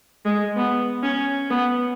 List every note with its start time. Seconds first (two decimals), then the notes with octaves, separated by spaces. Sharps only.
0.25 G#3
0.56 B3
1.03 C#4
1.50 B3